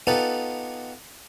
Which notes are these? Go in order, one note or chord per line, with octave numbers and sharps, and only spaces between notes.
B3 D#4 F4 G4 A4 B4